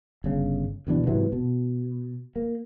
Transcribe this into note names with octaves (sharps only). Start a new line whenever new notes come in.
G1 C#3
D2 B2 E3 D4
G#2 C3 E3 F#3
B2
A#3